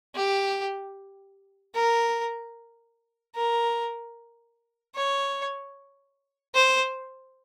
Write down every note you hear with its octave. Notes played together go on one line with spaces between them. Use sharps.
G4
A#4
A#4
C#5
C5